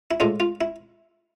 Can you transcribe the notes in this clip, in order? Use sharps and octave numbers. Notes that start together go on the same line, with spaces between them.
E4
A2 G#3 D4 F4
F4
E4